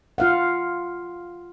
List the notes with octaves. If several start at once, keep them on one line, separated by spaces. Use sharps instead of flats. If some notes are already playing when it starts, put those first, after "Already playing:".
F4 F5 F#5